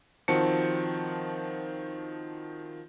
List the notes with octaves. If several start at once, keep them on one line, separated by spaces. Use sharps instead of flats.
D#3 F3 C4 F#4 A5 C#7